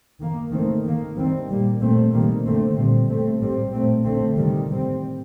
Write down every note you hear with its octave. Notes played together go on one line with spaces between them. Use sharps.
D#3 A#3
D#3 A3 C4
D#3 A#3
D#3 G3 C4
A#2 G3 A#3
A#2 A3 C4
C3 D#3 G3 A#3
D3 A3 C4
A#2 G3 C4
A2 A3 C4
A2 G3 C4
A#2 A3 C4
D3 A3 C4
C3 D#3 G3
A2 G3 C4